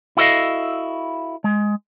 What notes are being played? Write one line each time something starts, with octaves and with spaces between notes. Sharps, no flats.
E4 F#4 A4 A#4 D#5 F5
G#3